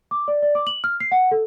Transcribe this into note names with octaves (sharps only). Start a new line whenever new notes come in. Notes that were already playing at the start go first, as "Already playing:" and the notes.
D6
D5
D5
D6
F#7
F6
C7
F#5
A4